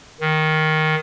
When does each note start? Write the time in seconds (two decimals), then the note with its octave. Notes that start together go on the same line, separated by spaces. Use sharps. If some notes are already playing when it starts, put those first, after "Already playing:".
0.21 D#3